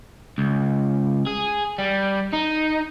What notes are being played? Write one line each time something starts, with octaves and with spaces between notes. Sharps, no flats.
C#2
G#4
G3
D#4